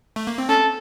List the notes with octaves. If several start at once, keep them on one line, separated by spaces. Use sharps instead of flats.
A3
A#3
C4
C#4 A4